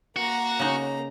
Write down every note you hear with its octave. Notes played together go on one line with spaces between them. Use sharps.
A#3 F#4 A#5
C#3 D#4